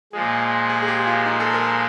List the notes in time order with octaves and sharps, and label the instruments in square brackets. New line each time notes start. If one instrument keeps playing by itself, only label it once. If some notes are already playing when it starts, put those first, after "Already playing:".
[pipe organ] A#2 F3 G#3 [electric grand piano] G#4
[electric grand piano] G#4
G#4
G4
F4
D#4
A4
A#4